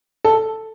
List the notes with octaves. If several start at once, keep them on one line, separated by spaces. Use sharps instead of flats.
A4